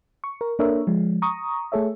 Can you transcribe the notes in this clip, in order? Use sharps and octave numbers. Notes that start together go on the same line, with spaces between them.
C#6
A#4
A#3 D4 A4 A#4 C#5 E5
F3 G#3
A#5 C#6 D#6
A3 G#4 A4 C#5 E5